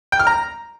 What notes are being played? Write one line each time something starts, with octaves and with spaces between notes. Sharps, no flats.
G5
F6
A#5